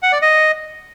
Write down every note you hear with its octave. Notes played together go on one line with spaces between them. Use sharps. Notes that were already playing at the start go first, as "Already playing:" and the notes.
F#5
D5
D#5